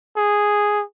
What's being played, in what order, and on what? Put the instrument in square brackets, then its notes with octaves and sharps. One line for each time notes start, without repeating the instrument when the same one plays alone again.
[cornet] G#4